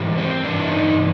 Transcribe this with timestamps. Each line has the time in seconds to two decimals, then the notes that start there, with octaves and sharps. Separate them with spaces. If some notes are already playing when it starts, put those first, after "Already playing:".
Already playing: G#2 E3 G3
0.18 C4
0.44 G2 E3 G3 D4
0.59 E4
0.71 D#4